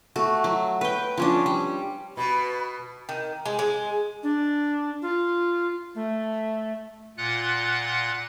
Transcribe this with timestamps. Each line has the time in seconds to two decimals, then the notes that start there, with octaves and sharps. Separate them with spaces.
0.16 A3 F#4
0.44 F#3
0.81 B4 G5
1.17 F3 C#4 D4
1.46 G3
2.17 B2 B5
3.09 D#3
3.46 G#3
3.59 G#3
4.23 D4
5.02 F4
5.95 A3
7.17 A#2 F4 F#5 F#6